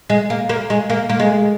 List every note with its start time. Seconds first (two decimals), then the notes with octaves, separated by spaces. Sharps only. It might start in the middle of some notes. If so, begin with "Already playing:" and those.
0.10 G#3
0.30 A#3
0.49 A#3
0.70 G#3
0.90 A#3
1.09 A#3
1.19 G#3